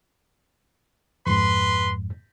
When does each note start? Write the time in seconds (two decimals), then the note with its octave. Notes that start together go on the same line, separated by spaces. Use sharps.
1.27 F2 G#2 B4 C6